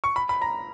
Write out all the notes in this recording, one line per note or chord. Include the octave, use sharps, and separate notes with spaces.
C#6
B5
B5
A#5